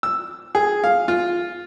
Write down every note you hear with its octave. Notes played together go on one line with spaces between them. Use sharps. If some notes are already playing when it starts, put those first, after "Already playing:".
E6
G#4
F5
F4